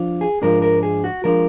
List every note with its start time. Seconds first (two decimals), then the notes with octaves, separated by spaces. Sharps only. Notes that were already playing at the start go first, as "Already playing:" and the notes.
Already playing: F3 D4 F4
0.21 G#4
0.42 G#2 F3 G#3 D4 F4 A#4
0.62 A#4
0.83 G#4
1.04 F#4
1.24 F3 G#3 D4 F4 A#4